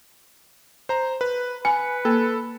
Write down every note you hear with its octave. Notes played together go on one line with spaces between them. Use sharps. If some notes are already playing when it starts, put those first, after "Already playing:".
C5 A#5
B4
B4 G#5 C#7
A#3 A4